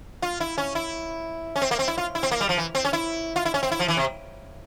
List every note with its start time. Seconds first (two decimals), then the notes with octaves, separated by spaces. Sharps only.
0.22 F4
0.40 E4
0.58 C#4
0.75 E4
1.56 C#4
1.62 C4
1.71 A#3
1.79 C4
1.88 E4
1.98 F4
2.15 E4
2.23 C4
2.31 A#3
2.41 G3
2.49 F3
2.57 E3
2.75 C4
2.85 C#4
2.93 E4
3.36 F4
3.45 E4
3.54 C#4
3.63 C4
3.72 E4
3.80 F3
3.88 E3
3.97 C3